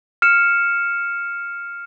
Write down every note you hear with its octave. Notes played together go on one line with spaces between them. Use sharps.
F6 C#7 E7